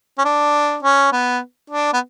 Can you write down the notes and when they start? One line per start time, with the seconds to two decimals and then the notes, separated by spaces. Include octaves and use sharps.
0.18 C#4
0.25 D4
0.83 C#4
1.12 B3
1.70 D4
1.94 B3